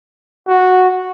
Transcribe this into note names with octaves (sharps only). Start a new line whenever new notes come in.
F#4